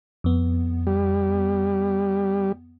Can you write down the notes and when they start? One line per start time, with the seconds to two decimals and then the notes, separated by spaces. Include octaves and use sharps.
0.24 F2 B3
0.87 G3